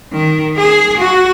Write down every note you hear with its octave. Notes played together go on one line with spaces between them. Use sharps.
D#3
G#4
F#4